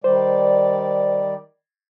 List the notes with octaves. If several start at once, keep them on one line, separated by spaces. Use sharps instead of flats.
D#3 G3 C5 D5